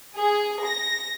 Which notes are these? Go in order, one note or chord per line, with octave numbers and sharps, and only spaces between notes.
G#4
A#6